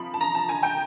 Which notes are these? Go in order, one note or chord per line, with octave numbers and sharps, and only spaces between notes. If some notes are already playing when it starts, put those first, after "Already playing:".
Already playing: C3 F3 B5
A5
A#5
A5
G#5
G5